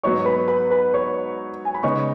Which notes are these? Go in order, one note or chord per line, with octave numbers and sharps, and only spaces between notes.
G#2 F#3 B3 D#4 C#5 C#6
B4 B5
B4 B5
B4 B5
C#5 C#6
G#5
B5
C#3 G#3 B3 D#4 C#5 C#6